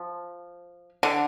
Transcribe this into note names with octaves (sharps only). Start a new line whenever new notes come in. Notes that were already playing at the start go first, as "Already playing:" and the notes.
Already playing: F3
D3